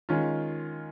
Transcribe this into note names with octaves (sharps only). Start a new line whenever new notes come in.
D#3 G#3 C#4 F4